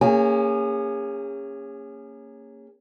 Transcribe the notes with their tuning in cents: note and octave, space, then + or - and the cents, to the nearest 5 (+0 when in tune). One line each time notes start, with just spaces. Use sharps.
A#3 -20 C#4 +0 G#4 -35